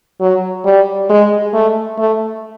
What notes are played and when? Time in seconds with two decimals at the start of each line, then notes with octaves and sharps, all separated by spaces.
0.21 F#3
0.65 G3
1.09 G#3
1.54 A3
1.98 A3